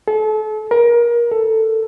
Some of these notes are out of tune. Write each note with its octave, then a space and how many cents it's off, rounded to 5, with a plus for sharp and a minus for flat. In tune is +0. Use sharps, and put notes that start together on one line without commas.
A4 -35
A#4 +25
A4 +10